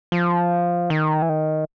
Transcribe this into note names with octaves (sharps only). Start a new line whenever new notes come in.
F3
D#3
E3
D#3